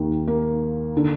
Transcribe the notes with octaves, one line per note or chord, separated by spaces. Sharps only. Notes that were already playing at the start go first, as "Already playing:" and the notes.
Already playing: D#2 D#3
A#3
D3